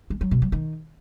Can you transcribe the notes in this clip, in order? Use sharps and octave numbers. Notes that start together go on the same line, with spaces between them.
G#3
F#3
B2
F#3
D#3